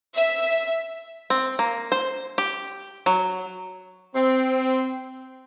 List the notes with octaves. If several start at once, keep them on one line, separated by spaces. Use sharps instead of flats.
E5
C4
A#3
C5
G4
F#3
C4